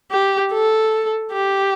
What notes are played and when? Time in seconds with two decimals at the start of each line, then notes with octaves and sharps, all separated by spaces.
0.11 G4
0.53 A4
1.32 G4